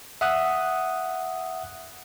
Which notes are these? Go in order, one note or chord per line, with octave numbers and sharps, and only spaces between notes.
E5 F#5 D#6 F#6